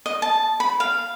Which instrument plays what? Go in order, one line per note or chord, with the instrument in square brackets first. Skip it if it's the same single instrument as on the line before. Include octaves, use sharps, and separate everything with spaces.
[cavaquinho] D#5
A5
B5
F5